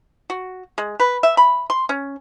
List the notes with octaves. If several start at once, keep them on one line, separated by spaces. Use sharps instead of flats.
F#4
G#3
B4
E5
B5
C6
C#4